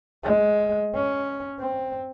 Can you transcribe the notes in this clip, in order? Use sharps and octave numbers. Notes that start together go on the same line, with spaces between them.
G#3
C#4
C4